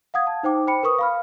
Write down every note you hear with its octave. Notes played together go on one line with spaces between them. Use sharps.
F5 F#5 D#6 G#6
A5
D#4 C5 G5 D6
C5 G5 B5 C#7
A#4 B4 C#6 D#6
F5 B5 F6